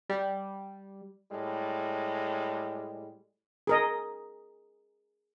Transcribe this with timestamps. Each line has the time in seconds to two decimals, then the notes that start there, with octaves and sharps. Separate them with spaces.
0.10 G3
1.31 A2 G3 G#3
3.67 G#4 A#4 D#5